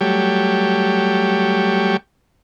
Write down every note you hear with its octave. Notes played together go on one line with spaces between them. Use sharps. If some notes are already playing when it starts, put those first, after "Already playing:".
F#3 G3 A3 G4 C#5